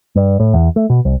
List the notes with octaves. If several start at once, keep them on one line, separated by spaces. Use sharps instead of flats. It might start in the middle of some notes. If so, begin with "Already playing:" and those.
G2
A2
E2
A3
B2
C2